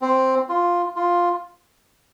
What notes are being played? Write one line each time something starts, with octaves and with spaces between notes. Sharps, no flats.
C4
F4
F4